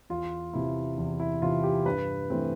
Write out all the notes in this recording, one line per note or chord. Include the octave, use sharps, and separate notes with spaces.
E2 F4
C3 E3 E4
E2
E4
C3 E3 F4
G4
G2 B4
E3 A3 C4